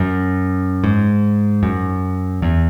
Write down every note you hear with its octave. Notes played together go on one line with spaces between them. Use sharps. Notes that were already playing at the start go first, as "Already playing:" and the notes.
Already playing: F#2
G#2
F#2
E2